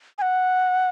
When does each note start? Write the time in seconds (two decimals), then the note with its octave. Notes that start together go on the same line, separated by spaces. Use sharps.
0.18 G#5
0.22 F#5